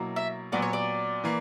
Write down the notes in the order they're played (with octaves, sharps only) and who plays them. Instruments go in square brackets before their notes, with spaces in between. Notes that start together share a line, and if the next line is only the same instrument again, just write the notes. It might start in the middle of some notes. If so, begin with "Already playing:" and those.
Already playing: [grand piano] B2 F#3 A#3 E4
[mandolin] E5
[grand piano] A#2 F#3 B3 F#4 [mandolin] D5
[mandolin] C#5
D5
[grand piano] E3 A#3